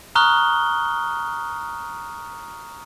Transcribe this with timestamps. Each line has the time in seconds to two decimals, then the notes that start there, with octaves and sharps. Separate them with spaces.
0.15 A#5 C#6 D#6 F6 F#6 G7